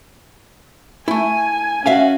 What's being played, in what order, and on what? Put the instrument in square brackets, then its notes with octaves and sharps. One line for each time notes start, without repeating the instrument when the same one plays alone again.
[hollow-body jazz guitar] A3 E4 [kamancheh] G#5
[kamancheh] C#4 F#4 [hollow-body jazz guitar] E5 F5 G#5